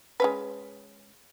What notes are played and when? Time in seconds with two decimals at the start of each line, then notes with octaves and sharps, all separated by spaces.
0.20 G#3 C#4 B4